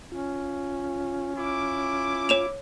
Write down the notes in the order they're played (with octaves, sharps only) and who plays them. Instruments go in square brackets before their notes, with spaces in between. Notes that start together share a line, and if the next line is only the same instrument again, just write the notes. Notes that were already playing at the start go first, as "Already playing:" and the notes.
[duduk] C#4 [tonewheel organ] F4
[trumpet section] E4 D6 [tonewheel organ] F4
[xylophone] C#5 E7 F7